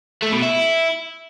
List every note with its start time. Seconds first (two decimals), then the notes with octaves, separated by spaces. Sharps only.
0.23 A3
0.33 B2
0.42 E4